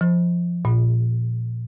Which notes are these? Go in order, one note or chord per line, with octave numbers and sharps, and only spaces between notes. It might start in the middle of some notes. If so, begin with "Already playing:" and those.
F3
A#2